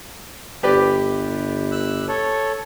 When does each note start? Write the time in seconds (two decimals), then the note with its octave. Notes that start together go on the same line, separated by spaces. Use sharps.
0.63 G1 G4 B4 D5
1.72 E6 F#6
2.08 A4 C#5